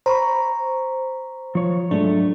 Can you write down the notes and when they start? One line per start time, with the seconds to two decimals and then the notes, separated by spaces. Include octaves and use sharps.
0.06 C5 A#5 B5 C#6
1.55 F3 F4 C#5
1.91 G#2 F#3 G#3 A3 D4